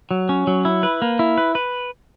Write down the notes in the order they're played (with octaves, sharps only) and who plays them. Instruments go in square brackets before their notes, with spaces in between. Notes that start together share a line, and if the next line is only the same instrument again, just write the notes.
[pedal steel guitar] F#3
C#4
F#3
E4
B4
A#3
E4
B4
B4